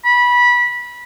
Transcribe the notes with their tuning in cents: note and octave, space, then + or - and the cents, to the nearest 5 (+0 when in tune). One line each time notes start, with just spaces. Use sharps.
B5 -20